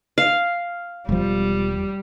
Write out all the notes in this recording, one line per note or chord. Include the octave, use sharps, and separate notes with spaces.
F5
E1 F3 G3